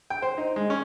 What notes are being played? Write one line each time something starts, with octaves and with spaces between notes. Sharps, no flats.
G5
C5
D#4
G#3
C#4